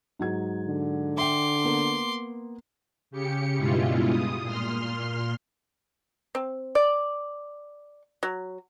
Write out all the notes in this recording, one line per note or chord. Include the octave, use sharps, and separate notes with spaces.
G#2 F#3 G#6
D3
E5 G5 C6 D6
A#3 B3
C#3 G4 C#7
G2 B2 G#3 E4 F4
D#6
A#2 C6 F6
C4
D5
F#3